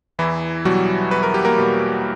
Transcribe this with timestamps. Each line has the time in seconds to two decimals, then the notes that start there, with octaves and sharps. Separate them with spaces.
0.19 E2 E3 E4
0.65 B2 F#3 G3 F#4
1.11 E2 B4
1.23 A#4
1.34 G4
1.45 A#3 A#4
1.58 B2 G3